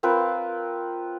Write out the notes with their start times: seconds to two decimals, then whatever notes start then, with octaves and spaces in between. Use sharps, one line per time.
0.03 C4 F4 A#4 B4